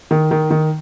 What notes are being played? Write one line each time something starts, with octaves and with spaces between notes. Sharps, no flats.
D#3
D#3
D#3